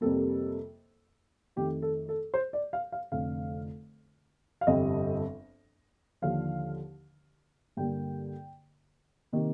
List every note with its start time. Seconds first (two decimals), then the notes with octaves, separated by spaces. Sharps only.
0.01 F2 C3 G3 A#3 A4
1.56 F2 D#3 A3 G4
1.82 A4
2.09 A4
2.34 C5
2.53 D5
2.73 F5
2.92 F5
3.12 F1 F2 D3 F5
4.61 F5
4.67 G1 F2 C3 G3 C4 D#5
6.22 D#2 D3 F3 F5
7.77 G2 D3 G3 A#3 G5
9.33 C3 D#3 A#3